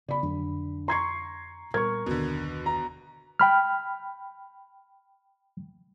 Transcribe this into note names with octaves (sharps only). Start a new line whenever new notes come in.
C#3 B3 D5 B5
F2 D3 F#3
A#5 C6 C#6 G#6 C7
A#2 G3 B3 A#4 C#6 G#6
F#1 D#2 B2 D3 D#3
A#5
G5 B5 F6